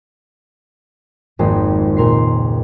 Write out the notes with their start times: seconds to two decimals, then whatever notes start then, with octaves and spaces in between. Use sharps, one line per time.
1.39 G#1 F2 G#3 A#3 C5 D#5
1.96 C#2 A#2 A#4 C6 C7